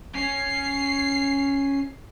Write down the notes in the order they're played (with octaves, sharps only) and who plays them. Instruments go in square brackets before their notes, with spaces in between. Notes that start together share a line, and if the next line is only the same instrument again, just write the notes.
[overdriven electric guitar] C#4 [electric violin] C7